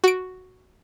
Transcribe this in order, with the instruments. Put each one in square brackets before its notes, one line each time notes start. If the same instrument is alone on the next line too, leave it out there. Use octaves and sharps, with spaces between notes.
[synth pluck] F#4 D7